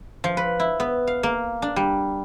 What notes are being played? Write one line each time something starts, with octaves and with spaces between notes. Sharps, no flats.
F3
B4
E4
B3
F5
A#3
D4
G3